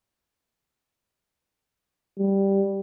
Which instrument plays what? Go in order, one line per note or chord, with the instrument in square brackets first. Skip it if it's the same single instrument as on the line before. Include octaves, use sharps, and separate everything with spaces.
[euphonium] G3